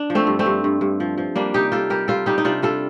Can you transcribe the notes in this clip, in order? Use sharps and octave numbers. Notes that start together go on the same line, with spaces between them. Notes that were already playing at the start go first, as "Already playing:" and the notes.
Already playing: D4
F3
A3 C4
G2
A3 C4
G2
G2
G2
F3
F3
G3 A#3 D4
C3 D#4 G4
G3 F4 A4
G3 G4 A#4
G3 F4 A4
G3 D#4 G4
D#4
C3 D4 F4
G3 F4 A4